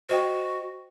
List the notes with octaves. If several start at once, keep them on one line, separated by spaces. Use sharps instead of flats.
F#4 C5 D#5 G5